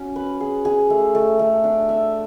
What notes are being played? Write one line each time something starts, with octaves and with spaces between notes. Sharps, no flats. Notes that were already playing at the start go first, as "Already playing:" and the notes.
Already playing: C#4 F#4
B4
G#4
G#4
A3
A3
A3
D4
E5